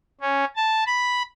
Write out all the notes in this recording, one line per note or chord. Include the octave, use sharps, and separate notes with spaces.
C#4
A5
B5